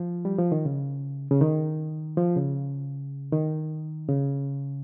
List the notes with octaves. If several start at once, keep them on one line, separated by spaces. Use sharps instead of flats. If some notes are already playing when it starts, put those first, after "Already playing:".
Already playing: F3
G3
F3
D#3
C#3
C#3
D#3
F3
C#3
D#3
C#3